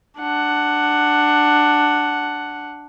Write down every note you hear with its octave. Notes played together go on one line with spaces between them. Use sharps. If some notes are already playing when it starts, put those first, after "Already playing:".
D4 F#5